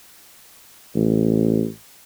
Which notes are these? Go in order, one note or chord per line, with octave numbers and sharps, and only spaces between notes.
A1